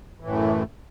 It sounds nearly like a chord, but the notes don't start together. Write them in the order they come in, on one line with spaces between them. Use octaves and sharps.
E3 A2 F#2 A3